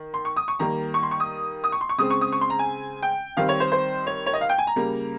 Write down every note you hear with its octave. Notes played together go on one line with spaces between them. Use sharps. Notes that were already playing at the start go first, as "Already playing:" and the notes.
Already playing: D#3
C6
C#6
D#6
C#6
D#3 G3 A#3 A#5
C#6
C6
C#6
D#6
D#6
C#6
C6
C#6
C#3 G#3 C4 D#6
C#6
D#6
C#6
C6
A#5
G#5
G5
D#3 G3 C4 F5
C#5
C5
C5
C#5
C#5
D#5
F5
G5
G#5
A#5
C#3 G3 A#3